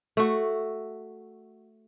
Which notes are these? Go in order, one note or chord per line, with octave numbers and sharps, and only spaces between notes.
A3 F#4